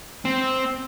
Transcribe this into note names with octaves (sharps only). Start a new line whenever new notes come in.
C4